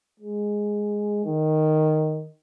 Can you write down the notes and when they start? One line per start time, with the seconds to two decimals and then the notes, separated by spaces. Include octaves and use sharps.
0.20 G#3
1.25 D#3